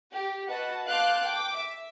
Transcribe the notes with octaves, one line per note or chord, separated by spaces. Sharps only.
G4
F#4 B4 D#5 F#5 A5
F5 A5 C6 D6 F#6 G6
G5 D6
E5